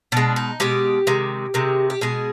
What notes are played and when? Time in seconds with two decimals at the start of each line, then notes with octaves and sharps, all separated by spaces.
0.12 B2 G#3 D4
0.36 D#4
0.60 B2 G#3 G4
1.07 C3 D#3 G#3
1.54 C3 D#3 G#3
1.90 G4
2.01 B2 G#3 G#4